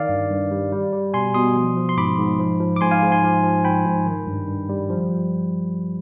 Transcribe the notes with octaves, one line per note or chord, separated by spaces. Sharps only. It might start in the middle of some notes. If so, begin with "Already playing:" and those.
Already playing: D#3 D5 F5
G2
G2
G3
G3
G3
B2 G#5 C6
B2 C6 D#6
F3
F3
C6
G#2 B5 D6
G#2
F3
F3
D6
G#2 G#5 C6
F5 G#5
G#2
G#5 C6
F3
F3
G#2 G5 B5
G#2
D#3
G2
G2
G3
F3